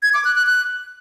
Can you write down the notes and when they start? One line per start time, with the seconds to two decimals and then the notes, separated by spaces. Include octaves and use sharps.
0.03 G#6
0.14 D6
0.25 F#6
0.36 F#6
0.47 F#6